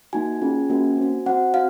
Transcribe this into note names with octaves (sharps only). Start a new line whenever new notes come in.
A#3 D#4 F#4 G#5
C#4 F4 G#4
A#3 C#4 F#4
C4 F#4
C4 F#4 F#5
F#4 F5